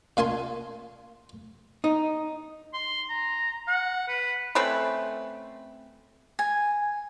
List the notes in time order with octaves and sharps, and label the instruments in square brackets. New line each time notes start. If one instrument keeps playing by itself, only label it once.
[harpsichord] A#2 F5 G#5 A5 C6
[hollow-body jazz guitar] D#4
[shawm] C6
A#5
F#5
B4
[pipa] A3 C4 C#4 B4
[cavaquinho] G#5